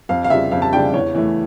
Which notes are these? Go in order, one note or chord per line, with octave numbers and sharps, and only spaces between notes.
F2 F5
F5
C#3 G3 D4 F4 E5
F2 F5
A5
C#3 G3 D4 F4 G5
E2 C#5
E3 A3